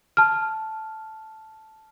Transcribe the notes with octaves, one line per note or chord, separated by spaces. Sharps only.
A5 F6